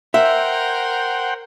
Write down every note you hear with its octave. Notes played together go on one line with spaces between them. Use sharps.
A#4 C5 E5 F#5 G5